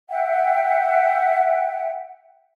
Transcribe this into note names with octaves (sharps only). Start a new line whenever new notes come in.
E5 F#5 G5